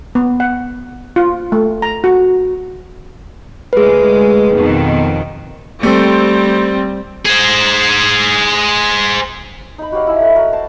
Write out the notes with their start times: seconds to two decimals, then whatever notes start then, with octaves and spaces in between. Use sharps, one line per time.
0.15 B3
0.40 F#5
1.16 F4
1.52 A3
1.82 A#5
2.04 F#4
3.73 D2 G#3 G#4 B4
4.53 F2 B2 D#3
5.83 G3 A3 C4
7.26 G#4 C5
9.78 D#4 B5
9.92 F#4 G4 C#5 F5
10.07 E4 E5 G#5
10.20 A3 D#5 F#5
10.35 F#4 A#4 F#5 A#5
10.53 C5 A5